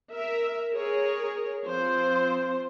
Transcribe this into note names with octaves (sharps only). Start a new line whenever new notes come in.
A#4 E5
G#4 A#4 C#5
F3 C4 C5